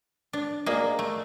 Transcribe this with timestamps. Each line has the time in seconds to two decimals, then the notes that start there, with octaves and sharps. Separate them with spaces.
0.33 D4
0.66 A#3 G#4 A#4 D5 D#5
0.99 A3